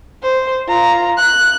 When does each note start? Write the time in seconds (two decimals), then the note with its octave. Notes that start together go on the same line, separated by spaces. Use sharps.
0.23 C5
0.69 F4 A#5
1.17 F#6